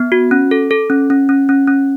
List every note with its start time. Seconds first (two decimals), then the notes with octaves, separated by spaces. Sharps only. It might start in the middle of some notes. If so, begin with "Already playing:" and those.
Already playing: B3
0.12 F#4
0.31 C#4
0.51 A4
0.71 A4
0.90 C#4
1.10 C#4
1.29 C#4
1.49 C#4
1.67 C#4